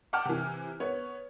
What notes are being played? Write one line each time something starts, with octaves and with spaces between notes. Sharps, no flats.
F#5 G5 A5 D6 F6
C3 E3
B3 C#5